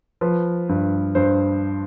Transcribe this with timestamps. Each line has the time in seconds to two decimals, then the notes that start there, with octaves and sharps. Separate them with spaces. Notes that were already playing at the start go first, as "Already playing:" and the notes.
0.21 F3 B4
0.69 G2
1.15 G2 C5